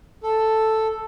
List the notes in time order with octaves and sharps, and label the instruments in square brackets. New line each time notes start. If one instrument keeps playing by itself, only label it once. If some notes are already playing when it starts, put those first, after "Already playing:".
[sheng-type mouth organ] A4